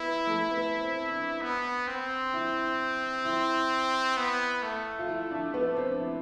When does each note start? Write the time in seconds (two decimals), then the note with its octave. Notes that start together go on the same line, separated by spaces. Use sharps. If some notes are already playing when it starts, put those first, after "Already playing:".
Already playing: B3 E4
0.27 A3
0.51 B3
0.80 C4
1.11 D4
1.42 B3
1.88 C4
2.33 E4
3.25 E4
4.17 B3
4.63 A3
4.99 F4
5.08 E4
5.31 D4
5.54 B3
5.77 C4
5.91 D4
6.00 E4